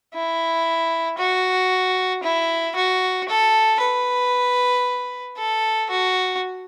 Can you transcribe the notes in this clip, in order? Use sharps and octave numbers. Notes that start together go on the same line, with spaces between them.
E4
F#4
E4
F#4
A4
B4
A4
F#4